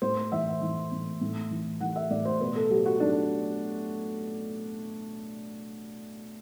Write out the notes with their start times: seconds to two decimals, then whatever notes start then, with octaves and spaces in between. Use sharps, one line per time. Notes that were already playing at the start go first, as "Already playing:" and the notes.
0.02 A2 C5
0.32 E3 E5
0.61 E3
0.92 A2
1.21 A2
1.51 E3
1.81 E3 F#5
1.96 E5
2.10 A2 D5
2.25 C5
2.40 B2 B4
2.56 A4
2.70 F#3 G4
2.86 F#4
3.00 F#3 D4